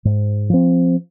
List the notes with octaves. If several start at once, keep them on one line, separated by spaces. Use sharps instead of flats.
G#2
F3 C4